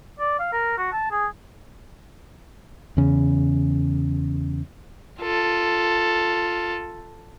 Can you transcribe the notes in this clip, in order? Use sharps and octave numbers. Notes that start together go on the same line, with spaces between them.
D5
F5
A#4
F#4
A5
G#4
E2 C#3
F4 A4